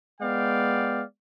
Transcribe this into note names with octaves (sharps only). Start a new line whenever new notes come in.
G#3 B3 D5 F5 G5